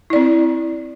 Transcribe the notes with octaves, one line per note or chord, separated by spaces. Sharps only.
C4 E4 D5